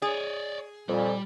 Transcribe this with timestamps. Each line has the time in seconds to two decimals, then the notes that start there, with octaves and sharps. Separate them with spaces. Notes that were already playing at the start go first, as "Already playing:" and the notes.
0.02 G#4 C#5 D5
0.89 F2 A#2 G3